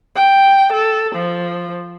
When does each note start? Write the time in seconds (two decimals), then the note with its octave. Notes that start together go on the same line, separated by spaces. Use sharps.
0.15 G5
0.72 A4
1.15 F3